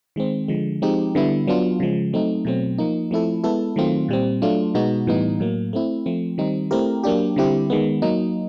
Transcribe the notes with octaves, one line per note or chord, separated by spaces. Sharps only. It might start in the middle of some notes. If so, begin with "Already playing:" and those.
D#3 G#3 C4
D3 F3 G#3
F3 G#3 C4 D#4 G4
D3 G3 B3 E4
F#3 B3 D4 F4
C#3 F3 G#3
F#3 A3 C4 D#4
B2 F#3 A3 C4
F3 A#3 D#4
F3 A3 C4 E4 A4
G#3 B3 E4 A4
D#3 F#3 A3 C4 F4
A#2 G3 C4
F#3 A3 D4 F4
B2 G#3 B3 D#4 F#4
A2 E3 G3 B3 D#4
A2 F#3 A#3
A3 C4 E4
F3 A3 C4
D#3 G3 C4 D#4
A3 C4 E4 G4 A#4
F#3 A#3 D4 G4
D3 G3 C4 E4 G4
D#3 G#3 B3
F#3 A#3 D#4